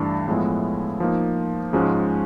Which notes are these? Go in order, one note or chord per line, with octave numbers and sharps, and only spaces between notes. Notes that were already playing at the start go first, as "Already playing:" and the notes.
Already playing: G2 E3 A3 D4
A2 F3 G#3 B3 E4
F3 A#3 D#4
G#2 F3 G#3 C#4 F#4